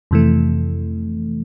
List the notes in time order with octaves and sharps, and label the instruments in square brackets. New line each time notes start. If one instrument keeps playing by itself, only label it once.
[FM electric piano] F2 C3 E3 A3